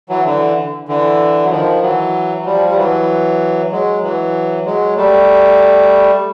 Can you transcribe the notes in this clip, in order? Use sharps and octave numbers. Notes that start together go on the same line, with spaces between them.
E3 F#3
D3 E3
D3 E3
F#3
D#3 F3
E3 F#3
F#3
F3 G3
G3
E3 F#3
F#3 G#3
E3 F#3
F#3 G#3
G3 A3